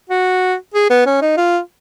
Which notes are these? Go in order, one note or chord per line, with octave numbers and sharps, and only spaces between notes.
F#4
G#4
B3
C#4
D#4
F4